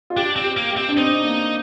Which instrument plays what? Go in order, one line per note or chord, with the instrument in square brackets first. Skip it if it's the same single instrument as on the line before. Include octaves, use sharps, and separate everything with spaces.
[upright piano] F4
[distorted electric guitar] D4 [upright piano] G4
[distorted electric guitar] C4
[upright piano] G4
[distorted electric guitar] A#3
[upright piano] G4
[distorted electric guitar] C4
[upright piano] D4
[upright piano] C4 [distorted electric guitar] D#4
[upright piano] A#3